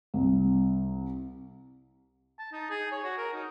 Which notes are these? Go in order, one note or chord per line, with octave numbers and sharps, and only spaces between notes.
C2
A5
D#4
G#4
C#5
F#4
A#4
D#4